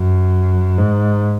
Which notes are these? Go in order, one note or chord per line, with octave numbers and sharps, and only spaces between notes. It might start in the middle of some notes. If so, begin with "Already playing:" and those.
Already playing: F#2
G#2